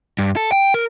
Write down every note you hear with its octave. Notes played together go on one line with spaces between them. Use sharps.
G2
A4
G5
A#4